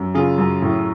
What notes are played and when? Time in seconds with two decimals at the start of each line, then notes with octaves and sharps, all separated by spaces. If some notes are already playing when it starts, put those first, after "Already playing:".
Already playing: F#2
0.14 C#3 F4 G#4
0.38 F#2
0.62 A2